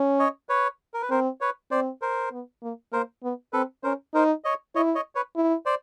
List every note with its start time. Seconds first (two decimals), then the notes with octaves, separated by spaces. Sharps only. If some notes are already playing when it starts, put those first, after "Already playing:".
Already playing: C#4
0.19 C#5 D#5
0.49 B4 C#5
0.94 A#4
1.02 B4
1.10 C4 A#4 C5
1.41 B4 C#5
1.71 C4 C5 D5
2.02 A#4 C5
2.32 B3
2.63 A#3
2.92 A#3 A#4 C5
3.23 B3
3.53 C4 A4 B4
3.83 C#4 A#4 C5
4.14 D#4 A#4 C5
4.44 C#5 D#5
4.75 E4 C#5 D#5
4.95 C#5 D#5
5.15 B4 C#5
5.36 E4
5.66 C5 D5